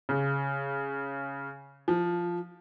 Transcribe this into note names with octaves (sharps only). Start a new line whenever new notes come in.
C#3
F3